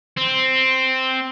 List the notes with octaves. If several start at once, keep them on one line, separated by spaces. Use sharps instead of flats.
C4